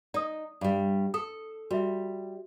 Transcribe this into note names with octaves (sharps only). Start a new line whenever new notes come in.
D#4 D5 D#6
G2 G3
A4 D#6
G3 F#4 E5